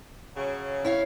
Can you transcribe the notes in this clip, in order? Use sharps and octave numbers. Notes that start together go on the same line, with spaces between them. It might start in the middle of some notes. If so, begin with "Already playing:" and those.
C#3 F#3
E4 C#5 F5